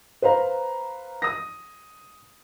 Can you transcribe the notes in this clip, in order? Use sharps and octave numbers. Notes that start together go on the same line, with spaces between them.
B4 C5 F5 A#5
D#6 A#6